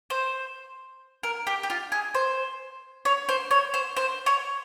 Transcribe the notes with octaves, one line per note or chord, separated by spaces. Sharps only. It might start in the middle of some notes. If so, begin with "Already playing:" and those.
C5
A#4
G4
G4
F4
G#4
C5
C#5
C5
C#5
C5
C5
C#5